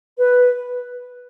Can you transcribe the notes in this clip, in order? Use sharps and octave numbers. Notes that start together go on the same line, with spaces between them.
B4